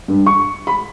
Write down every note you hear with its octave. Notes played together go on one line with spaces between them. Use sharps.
G2
C#6
B5